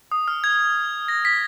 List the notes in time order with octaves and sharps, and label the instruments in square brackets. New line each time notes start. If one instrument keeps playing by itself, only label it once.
[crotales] D#6
F6
G#6
A#6
B6